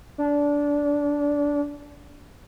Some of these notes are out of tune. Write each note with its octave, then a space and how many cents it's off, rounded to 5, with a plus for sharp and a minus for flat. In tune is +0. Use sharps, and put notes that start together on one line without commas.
D4 -20